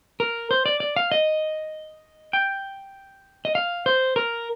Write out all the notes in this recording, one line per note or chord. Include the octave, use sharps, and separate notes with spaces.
A#4
C5
D5
D5
F5
D#5
G5
D#5
F5
C5
A#4